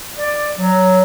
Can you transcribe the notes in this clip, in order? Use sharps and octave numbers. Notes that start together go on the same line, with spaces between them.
D5
F#3